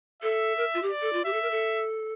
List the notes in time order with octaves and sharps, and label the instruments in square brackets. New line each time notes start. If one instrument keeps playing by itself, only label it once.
[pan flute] A4 [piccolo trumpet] E5
[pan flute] A#4
F4
G4
[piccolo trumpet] D5
[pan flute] A4
F4
[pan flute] G4 [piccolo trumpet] E5
[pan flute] A4
A#4
A4